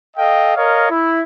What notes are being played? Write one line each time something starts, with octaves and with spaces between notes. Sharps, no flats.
A4 D#5 F5 G5
A#4 C#5 D#5 F5
E4